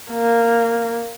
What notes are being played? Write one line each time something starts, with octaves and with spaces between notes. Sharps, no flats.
A#3